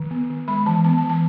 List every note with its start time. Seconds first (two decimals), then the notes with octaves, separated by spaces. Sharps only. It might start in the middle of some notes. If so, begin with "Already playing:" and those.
Already playing: D#3
0.11 B3
0.30 D#3
0.48 G#3 B5
0.66 E3 A5
0.84 B3 A5
0.98 A5
1.04 E3
1.10 A5